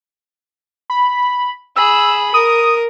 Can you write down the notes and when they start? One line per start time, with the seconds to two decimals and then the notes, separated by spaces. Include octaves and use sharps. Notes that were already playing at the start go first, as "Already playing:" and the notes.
0.90 B5
1.76 G#4 B5 E6
2.34 A#4 D#6